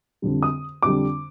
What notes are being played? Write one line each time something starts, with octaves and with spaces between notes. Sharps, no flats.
F2 D3 G3
D#6
F2 D3 G3 D6